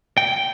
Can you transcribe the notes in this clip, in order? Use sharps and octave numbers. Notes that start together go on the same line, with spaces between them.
G5